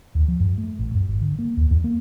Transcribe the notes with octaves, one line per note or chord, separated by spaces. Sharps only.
D#2
F3
F#2
A3
A1
F#2
G#1
D3
A#3
D#2
E2
A#3